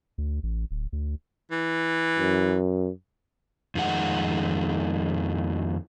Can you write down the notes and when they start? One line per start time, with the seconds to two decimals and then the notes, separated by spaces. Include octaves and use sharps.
0.18 D2
0.43 A1
0.71 D1
0.93 D2
1.52 E3
2.18 F#2
3.75 F2 D#3 G#3 F#5